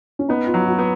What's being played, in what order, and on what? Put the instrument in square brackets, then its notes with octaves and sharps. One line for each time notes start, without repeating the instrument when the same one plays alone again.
[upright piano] C#4
[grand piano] B3 [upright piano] D#4
[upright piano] F4
[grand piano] F#3
[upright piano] F#4
[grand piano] B3